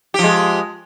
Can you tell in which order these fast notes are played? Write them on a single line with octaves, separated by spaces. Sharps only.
G4 F3 G#3